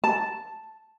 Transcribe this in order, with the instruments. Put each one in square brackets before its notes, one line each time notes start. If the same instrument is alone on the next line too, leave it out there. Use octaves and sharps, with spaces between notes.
[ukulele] A5